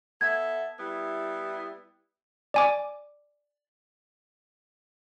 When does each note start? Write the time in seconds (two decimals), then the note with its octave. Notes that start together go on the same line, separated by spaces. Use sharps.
0.21 B3 A4 E5 G#6
0.79 G3 B3 E4
2.54 D5 G#5 D6